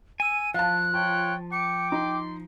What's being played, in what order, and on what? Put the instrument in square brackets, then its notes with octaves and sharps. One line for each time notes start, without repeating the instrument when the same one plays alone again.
[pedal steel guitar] G#5 E6 [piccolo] D#7
[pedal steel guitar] F3 [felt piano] F5 A5 [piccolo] F#6
[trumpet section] F4 C#5 G5 [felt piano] A5
[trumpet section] G5 D6 [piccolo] C#7
[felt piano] D#4 [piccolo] C6